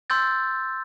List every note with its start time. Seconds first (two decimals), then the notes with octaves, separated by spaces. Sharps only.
0.10 C6 E6 G6 A6